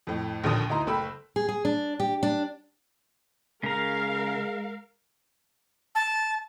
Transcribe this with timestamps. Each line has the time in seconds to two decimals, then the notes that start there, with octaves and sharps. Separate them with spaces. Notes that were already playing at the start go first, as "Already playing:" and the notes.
0.07 F2 A2
0.44 A#1 D#2 A#2 D3 D#6
0.69 D2 D#4 E4 A#5 C6
0.87 F#1 A3 G5 B5 E6
1.36 G#4
1.49 G#4
1.65 D4
2.00 G4
2.23 D4
3.63 C#3 G#3 A#4 F5 A#5
5.95 A5